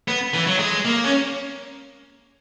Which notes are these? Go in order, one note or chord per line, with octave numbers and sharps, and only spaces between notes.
B3
E3
F#3
G#3
A#3
C#4